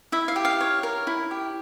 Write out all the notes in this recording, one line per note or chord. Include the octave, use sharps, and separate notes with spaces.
E4 E5
F5
G4
F5
C#5
A#4
E4
G4